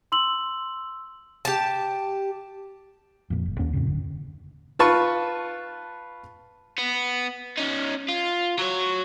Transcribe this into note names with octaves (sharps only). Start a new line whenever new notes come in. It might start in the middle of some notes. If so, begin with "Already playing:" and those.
C6 E6 F#7
G4 A5
F2 A#2
F#1
D#2 A#3 C#4
F2 A2 C#3
F#1 D3
F4 B4 A5 C#6
B3
C#4 D#4
F4
F#3 C#5